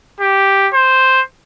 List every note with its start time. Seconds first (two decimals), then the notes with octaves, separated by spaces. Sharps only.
0.20 G4
0.74 C5